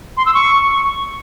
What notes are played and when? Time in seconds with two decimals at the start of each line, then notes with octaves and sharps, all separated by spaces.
0.17 C6
0.26 E6
0.34 C#6